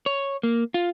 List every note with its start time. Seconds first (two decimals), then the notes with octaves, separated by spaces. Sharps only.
0.06 C#5
0.43 A#3
0.74 F4